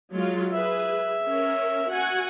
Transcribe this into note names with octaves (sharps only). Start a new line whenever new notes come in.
F#3 G#3 F4
G#4 B4 E5
C#4 A#4
F#4 F#5 G#5